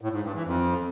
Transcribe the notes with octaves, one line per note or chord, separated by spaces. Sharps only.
A2
G#2
G2
E3
F2